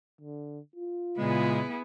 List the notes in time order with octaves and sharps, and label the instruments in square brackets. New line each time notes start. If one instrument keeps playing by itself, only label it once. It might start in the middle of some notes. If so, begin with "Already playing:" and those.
[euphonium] D3
F4
[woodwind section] A#2 C#3 G#3 [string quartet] B3 E4 G#4